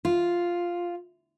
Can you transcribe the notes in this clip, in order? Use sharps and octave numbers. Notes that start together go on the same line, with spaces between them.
F4